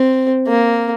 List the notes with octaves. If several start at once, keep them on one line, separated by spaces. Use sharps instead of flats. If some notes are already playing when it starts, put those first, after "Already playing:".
Already playing: C4
A#3